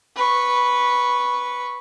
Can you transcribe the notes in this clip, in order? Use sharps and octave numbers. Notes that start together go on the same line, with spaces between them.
B4 C#6